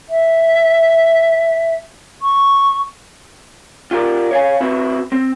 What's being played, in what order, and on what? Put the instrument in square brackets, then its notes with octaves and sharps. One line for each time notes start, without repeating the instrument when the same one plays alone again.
[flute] E5
C#6
[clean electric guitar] F4 G4 A#4 D5
C#5 F5 G#5
C4 E4 F#4 B4
C4